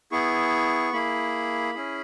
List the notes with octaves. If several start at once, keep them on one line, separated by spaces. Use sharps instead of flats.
B3 E4 G#4 C#6
A#3 E4 G#4 B5
C#4 E4 G#4